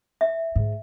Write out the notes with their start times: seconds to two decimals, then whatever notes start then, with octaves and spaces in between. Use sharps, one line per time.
0.21 E5
0.56 G#2